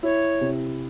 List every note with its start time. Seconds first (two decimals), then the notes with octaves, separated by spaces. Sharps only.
0.03 E4 C#5
0.41 C3